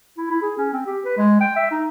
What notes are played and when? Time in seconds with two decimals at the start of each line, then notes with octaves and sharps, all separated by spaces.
0.17 E4
0.30 E4
0.42 G#4
0.58 C#4
0.73 C4
0.86 G4
1.05 B4
1.17 G#3
1.40 G5
1.56 E5
1.71 D#4